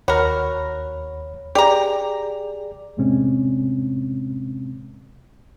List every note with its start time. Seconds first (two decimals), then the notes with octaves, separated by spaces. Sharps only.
0.08 D#2 F#4 A#4 C#5 B5
1.55 G4 G#4 D5 A#5 D6
2.97 E2 A2 C3 G#3 C4 C#4